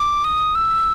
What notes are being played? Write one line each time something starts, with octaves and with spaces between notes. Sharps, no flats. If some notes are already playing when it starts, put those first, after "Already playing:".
Already playing: D6
D#6
E6